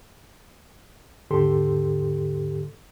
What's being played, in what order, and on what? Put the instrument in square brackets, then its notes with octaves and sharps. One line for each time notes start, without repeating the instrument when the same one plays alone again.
[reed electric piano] D#2 G#2 D3 G4 A4 C6